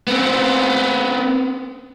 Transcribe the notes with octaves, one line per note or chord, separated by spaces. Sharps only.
B3 C4